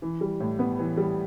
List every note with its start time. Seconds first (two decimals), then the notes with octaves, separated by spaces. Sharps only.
0.02 E3
0.21 G3
0.40 A2
0.59 B3
0.79 E3
0.97 G3